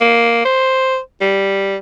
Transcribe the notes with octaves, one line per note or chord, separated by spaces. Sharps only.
A#3
C5
G3